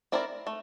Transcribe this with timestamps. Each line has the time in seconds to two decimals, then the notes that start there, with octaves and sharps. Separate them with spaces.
0.12 C4 E4 A#4 D5
0.47 A3